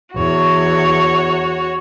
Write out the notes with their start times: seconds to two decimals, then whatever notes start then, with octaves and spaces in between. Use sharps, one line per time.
0.16 E2 F#4 C#5